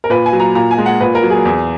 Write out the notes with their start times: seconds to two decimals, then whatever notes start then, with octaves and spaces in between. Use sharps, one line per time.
0.04 A#4
0.10 A#2 B4
0.26 G#5
0.33 F#3
0.40 A#5
0.55 A#2 A#5
0.71 G#5
0.78 G#3
0.86 F#5
1.01 A#2 B4
1.15 A#4
1.23 F#3
1.30 G#4
1.45 E2